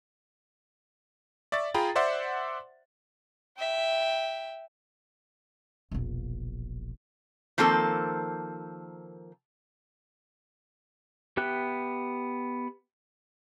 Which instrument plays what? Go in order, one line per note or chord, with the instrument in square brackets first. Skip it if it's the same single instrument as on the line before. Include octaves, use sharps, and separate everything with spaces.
[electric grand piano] D5 E5 C#6 A6
F4 G#4 G5 A#5 B5
C5 D5 E5 F#5 C6
[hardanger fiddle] E5 G5
[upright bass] E1 A#1
[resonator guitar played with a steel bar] D#3 F3 A#3 C4 A4
[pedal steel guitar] B3 G4 E5 G5 F#6